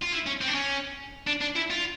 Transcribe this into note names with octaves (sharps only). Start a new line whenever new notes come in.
F4
E4
C#4
C4
D4
C#4
D4
D4
E4
F4